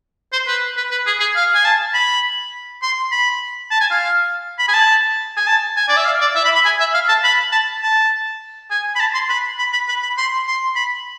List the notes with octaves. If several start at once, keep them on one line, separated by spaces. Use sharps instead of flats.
C5
B4
B4
B4
G#4
G#4
F5
G#5
A5
B5
C6
B5
A5
G#5
F5
B5
G#5
A5
G#5
A5
G#5
D5
E5
F5
D5
E5
B5
B5
G#5
E5
F5
A5
B5
A5
A5
G#5
B5
A5
C6
B5
B5
B5
B5
B5
C6
C6
B5